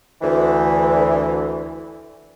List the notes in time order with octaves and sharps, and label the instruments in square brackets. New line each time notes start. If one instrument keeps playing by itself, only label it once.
[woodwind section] D2 E3